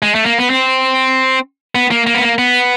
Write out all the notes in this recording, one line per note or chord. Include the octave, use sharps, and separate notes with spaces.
G#3
A3
A#3
B3
C4
B3
A#3
A#3
B3
A#3
B3